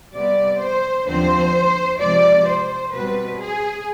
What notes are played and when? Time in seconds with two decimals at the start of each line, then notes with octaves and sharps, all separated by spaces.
0.14 C3 G3 B3 D5
0.61 C5
1.07 D#2 D3 F3 C4 C5
2.00 C3 F3 G#3 D5
2.47 C5
2.93 B2 G3 C4 B4
3.40 G#4